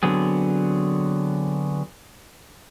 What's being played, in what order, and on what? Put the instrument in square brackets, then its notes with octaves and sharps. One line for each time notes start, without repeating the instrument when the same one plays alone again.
[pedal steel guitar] D3 F#3 B3 C4 G#4